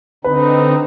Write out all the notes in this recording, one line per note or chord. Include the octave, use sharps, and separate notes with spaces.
D3 C4 D#4 B4